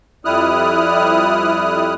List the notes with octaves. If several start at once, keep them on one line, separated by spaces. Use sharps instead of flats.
F2 G3 E4 D#6 F6 F#6